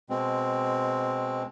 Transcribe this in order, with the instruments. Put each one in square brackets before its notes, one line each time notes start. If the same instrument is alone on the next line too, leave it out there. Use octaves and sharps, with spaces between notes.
[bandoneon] B2 G#3 C4